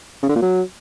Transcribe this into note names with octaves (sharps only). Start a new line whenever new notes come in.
C#3
D3
A#2
F#3